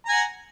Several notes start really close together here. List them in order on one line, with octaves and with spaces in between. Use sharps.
A#5 G#5 F#5